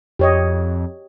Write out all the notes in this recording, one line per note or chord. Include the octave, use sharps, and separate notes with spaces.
F2 G4 C#5 D#5